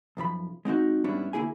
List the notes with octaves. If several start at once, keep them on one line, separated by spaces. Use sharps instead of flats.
B1 F#2 F3 B5
G#3 C4 D#4 F#4
G#2 G3 B3 C#4 D4 E4
D2 A#3 E4 G#4 G#5